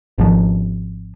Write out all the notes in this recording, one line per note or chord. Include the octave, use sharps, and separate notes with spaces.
G#1 F3